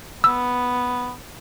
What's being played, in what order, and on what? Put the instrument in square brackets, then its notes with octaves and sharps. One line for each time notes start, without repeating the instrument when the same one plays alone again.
[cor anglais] B3 [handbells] E6